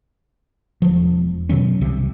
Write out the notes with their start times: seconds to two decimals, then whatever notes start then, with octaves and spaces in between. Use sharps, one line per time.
0.82 E1 F3
1.49 B2 D#3 F#3 C#4
1.81 C2 C3